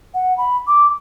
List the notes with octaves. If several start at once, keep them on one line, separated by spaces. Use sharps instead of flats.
F#5
B5
D6